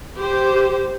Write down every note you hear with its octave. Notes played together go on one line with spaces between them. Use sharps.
G4 C5